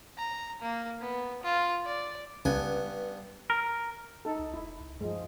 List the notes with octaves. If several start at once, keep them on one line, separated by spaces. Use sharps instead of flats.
A#5
A#3
B3
F4
D5
C#2 G2 B3 G#5
A#4
D#4 A4
C#2
F1 E4
C#2
G2 F3 G#3